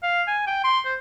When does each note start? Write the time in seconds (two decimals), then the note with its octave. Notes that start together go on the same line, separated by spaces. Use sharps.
0.03 F5
0.27 G#5
0.47 G5
0.64 C6
0.85 C5